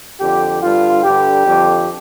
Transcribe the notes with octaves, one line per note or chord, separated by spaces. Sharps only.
F2 D3 G4
G2 D3 F4
G2 D3 G4
F2 D3